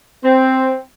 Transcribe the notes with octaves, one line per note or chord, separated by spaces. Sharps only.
C4